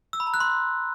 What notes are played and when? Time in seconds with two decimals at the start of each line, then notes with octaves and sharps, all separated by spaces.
0.13 E6
0.20 B5
0.27 A#5
0.34 F#6
0.40 C6